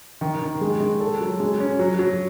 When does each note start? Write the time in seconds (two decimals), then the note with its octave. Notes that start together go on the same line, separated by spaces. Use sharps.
0.21 D#3
0.42 D#3
0.61 G#3
0.80 G#3
1.01 A4
1.21 F#3
1.40 G#3
1.60 C#4
1.79 F#3
1.99 F#3